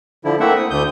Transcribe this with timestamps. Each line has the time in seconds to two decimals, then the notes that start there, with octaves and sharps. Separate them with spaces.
0.25 D3 F3 E4
0.40 A3 A#3 C4 E4 E5 F#5
0.56 D#6
0.70 D2 D#6 G6